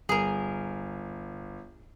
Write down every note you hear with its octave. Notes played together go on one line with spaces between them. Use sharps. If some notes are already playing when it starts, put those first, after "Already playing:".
G1 G#4 A#4